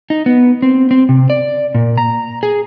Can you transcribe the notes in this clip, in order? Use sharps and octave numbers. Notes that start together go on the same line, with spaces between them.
D#4
B3
C4
C4
C3
D5
A#2
A#5
G#4